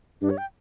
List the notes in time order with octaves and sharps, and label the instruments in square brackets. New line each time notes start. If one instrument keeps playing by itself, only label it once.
[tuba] G2 [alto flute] D4
[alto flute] C#5
G5